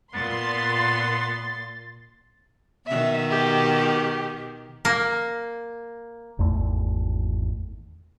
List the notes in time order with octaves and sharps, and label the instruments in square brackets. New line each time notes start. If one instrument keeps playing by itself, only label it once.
[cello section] A#2 [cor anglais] B3 [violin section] C6 [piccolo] A6
[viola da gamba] B2 D#3 [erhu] E5
[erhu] G4
[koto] A#3
[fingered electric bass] G#1 E2 A3